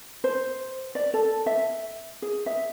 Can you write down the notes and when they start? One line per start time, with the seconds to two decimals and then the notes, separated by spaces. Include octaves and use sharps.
0.24 C5
0.95 D5
1.14 A4
1.46 E5
2.22 G#4
2.46 E5